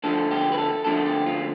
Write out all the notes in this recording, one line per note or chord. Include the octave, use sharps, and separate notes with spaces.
D2 D3 F3 A3 A4
G4
B4
A4
D2 D3 F3 A3 A4
G4
F4